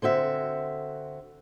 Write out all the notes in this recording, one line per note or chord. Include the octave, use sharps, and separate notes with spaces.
D3 C4 F#4 E5